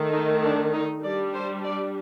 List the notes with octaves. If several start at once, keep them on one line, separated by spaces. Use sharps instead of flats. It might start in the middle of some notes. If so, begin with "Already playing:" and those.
Already playing: D#3 A3
D#4
D4
D#4
G3 D4 D5
C5
D5